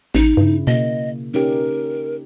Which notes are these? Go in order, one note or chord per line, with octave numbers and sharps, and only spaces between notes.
A1 D#4
G2 C#3 E4
B2 A#3 D#5
C#4 D#4 G4 A#4